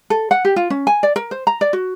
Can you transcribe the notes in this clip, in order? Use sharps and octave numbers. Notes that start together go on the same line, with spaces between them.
A4
F#5
G4
F4
C#4
G#5
D5
A#4
C5
A#5
D5
F#4